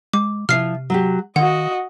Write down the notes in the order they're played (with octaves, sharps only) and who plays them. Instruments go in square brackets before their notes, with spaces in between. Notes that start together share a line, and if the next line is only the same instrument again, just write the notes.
[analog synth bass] G#3 [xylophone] D6
[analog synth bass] C3 [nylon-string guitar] F3 E4 F4 [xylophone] F6 C7
[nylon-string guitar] F#3 F#4 G4
[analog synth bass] D#3 [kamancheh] F#4 D#5 [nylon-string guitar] F5 [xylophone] F#5